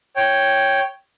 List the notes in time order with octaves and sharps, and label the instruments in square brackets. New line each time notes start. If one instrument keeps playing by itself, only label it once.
[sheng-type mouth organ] C#5 G5